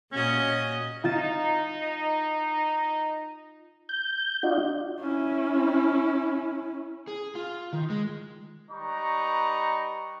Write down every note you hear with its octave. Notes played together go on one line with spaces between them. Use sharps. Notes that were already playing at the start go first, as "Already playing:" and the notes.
A#2 C#4 F#4 D#5
D#4 F4 A6 E7
G6
D4 D#4 F4 F#4
C#4 E4
G#4
F4
D#3
G#3
G3 D#4 B4 A#5 C#6